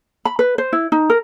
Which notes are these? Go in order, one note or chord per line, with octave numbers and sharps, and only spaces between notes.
B5
B4
C5
E4
D#4
A#4